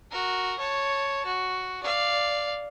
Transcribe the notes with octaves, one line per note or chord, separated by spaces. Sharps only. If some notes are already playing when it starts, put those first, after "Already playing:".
F#4 A#4
C#5 A5
F#4
D5 F5